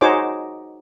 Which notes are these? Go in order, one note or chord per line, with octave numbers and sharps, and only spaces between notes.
D#4 F#4 G#4 C5 C#5 D6